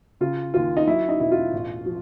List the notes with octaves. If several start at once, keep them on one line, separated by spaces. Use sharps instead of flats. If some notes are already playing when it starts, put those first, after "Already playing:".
C#3 F4
D#2 F4
D#4
F#3 E4
D#4
E1 E4
F4
A1
F3